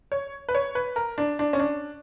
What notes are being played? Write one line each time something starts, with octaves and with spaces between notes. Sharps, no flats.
C#5
B4
C#5
B4
A#4
D4
D4
C#4
D4